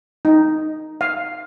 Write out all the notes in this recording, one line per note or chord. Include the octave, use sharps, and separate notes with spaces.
D#4
F5